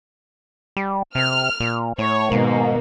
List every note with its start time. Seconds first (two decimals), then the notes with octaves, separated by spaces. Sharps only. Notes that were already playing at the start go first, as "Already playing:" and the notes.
0.77 G3
1.15 C3 F6
1.60 A#2
1.98 A2 C#5
2.32 G#2 B2 D#3 A#3